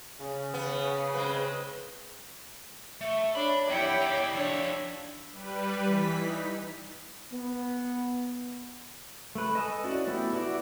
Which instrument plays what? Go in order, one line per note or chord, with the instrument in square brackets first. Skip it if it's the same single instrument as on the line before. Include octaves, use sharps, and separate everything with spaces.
[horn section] C#3
[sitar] B3
G#3 C4 B4
[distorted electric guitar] A3 [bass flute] E5
[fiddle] D4 [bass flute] C#5 [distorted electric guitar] B5
[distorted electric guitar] E2 F#5 [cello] E4 G4 [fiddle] G5
[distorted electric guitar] D#4 D5
[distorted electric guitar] F3 E5 [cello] D4 [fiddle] C#5
[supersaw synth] G3 B4
E3 B6
D#4
[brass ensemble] B3
[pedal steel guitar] A3 B4
A4 D#5 G#5 A5 D#6
C#4 E4 F#4 D5
A3 B3 E4 G4
E4 F#4 D5